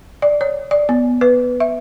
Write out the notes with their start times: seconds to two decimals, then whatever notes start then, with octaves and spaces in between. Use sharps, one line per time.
0.22 D5
0.41 C#5
0.71 D5
0.89 B3
1.21 B4
1.60 E5